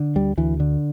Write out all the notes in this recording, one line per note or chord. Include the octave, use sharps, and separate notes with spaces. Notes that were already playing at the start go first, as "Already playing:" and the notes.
Already playing: D3
D2 G3
D2 E3
D3